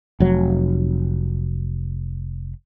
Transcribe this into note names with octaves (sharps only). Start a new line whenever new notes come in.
F1 F#3